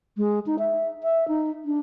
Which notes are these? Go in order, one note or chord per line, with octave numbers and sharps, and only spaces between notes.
G#3
D#4
E5
E5
D#4
D4